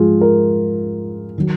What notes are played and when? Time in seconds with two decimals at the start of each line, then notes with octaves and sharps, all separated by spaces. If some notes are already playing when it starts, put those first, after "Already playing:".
Already playing: G#2 F3 G#3 F4 G#4
0.21 A#4
1.38 D#3 F#3